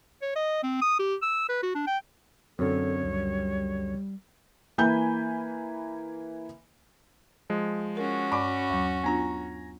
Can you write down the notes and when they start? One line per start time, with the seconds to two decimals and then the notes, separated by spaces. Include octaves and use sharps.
0.22 C#5
0.36 D#5
0.63 C4
0.82 D#6
0.99 G4
1.22 E6
1.49 B4
1.63 F#4
1.75 D4
1.87 G5
2.59 F#2 D3 C4 A4 C#5
3.03 C#2 G3
4.78 E3 A#3 G#5 B5 G6
7.50 F3 G#3
7.97 C#4 F#4 A#4
8.32 G2 D5 B5 C#6 D6
8.70 D#2 F#3
9.04 B3 D4 F4 G#5 A#5